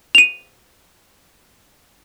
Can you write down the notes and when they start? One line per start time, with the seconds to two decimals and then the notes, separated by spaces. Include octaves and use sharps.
0.15 D#7 F7